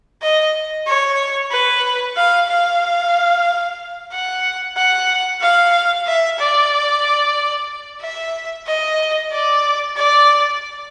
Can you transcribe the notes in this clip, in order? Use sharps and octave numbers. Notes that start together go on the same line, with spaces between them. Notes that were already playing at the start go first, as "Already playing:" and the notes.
D#5
C#5
B4
F5
F5
F#5
F#5
F5
E5
D5
E5
D#5
D5
D5